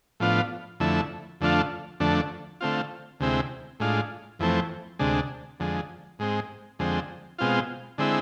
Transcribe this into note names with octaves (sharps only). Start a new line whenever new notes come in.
A2 F3 B3 D4 F4
F2 D3 A3 E4
F2 D3 A3 D4 F4
F2 D3 A3 D4
D3 A3 C4 F4
D2 C3 G#3 C4 E4
A2 G#3 D4 F4
F2 E3 A3 C4
D2 C3 G#3 D4
F2 D3 G#3
G#2 G#3 C4
F2 D3 G#3 C4
B2 G#3 C4 F4
D3 G#3 C4 E4